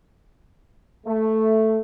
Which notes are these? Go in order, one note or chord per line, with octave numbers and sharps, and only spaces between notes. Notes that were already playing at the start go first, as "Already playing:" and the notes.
A3